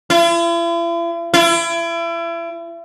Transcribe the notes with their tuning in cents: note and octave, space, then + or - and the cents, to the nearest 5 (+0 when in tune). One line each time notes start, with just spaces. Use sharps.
E4 +45
E4 +35